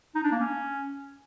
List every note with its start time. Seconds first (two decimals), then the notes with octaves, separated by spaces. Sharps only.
0.15 D#4
0.23 D4
0.31 A#3
0.39 C#4